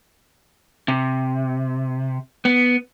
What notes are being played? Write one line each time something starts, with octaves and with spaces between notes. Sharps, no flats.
C3
B3